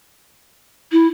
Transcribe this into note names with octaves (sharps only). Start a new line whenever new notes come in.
E4